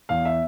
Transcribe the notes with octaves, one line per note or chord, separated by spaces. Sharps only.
E2 F5
E5